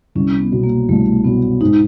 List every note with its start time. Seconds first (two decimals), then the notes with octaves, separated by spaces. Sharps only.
0.15 C2 C#4
0.39 B3
0.52 B2 F#3
0.64 A#3
0.89 C2 A3
1.25 B2 F#3 B3
1.61 G#2 D#4